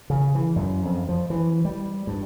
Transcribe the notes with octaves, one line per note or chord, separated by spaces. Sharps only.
C#3
E3
F#2
F2
F3
E3
G3
G2